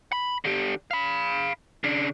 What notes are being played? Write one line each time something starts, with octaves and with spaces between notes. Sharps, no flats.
B5
D3 G4
F5 B5
C#3 D4